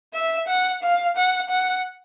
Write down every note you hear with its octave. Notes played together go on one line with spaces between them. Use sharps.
E5
F#5
F5
F#5
F#5